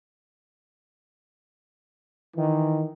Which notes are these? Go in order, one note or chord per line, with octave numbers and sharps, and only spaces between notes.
D#3 E3